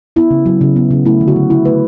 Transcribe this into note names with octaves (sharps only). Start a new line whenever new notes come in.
B3 E4
C#3
F#3
C#3
B3
C#3
A3 E4
D3
F#4
F#3
D3 E4
A3 B4